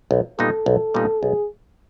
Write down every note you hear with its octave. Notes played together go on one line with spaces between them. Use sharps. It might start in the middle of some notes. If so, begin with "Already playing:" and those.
B1
A#2 G3 B3 D#4 A4
B1
A#2 G3 B3 D#4
B1 G#4